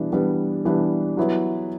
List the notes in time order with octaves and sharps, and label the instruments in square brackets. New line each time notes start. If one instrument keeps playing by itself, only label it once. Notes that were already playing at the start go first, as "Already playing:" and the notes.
Already playing: [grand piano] E3 G3 B3 D4
E3 G3 B3 D4
E3 G3 B3 D4
F#3 B3 E4